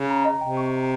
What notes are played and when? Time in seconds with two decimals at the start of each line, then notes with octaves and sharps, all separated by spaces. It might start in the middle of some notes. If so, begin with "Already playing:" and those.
Already playing: C#3
0.09 A#5
0.25 D#5
0.41 C3 G5
0.57 C#6
0.74 A#5